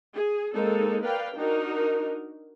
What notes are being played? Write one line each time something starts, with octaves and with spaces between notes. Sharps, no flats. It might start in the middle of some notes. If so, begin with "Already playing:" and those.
G#4
G#3 A#3 C4 D#4 A4
A#4 B4 D5 F5 G5
D4 D#4 F#4 A#4